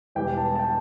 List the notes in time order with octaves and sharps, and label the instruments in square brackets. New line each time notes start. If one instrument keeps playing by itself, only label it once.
[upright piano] E1 E2 E3 G3 G5
A5
A5
G5